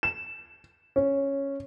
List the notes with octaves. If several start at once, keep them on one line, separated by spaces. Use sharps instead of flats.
E7
C#4